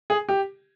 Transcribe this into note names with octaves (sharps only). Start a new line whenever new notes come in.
G#4
G4